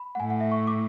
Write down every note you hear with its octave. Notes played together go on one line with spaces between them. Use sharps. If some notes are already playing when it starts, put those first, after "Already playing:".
Already playing: B5
F#5
A2 G#5
F#5
E5
C#6
D6